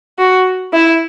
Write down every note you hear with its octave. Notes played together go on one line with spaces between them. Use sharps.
F#4
E4